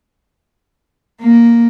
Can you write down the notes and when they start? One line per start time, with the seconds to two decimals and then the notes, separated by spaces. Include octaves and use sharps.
1.22 A#3